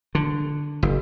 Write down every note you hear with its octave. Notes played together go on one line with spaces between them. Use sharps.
D3
F#1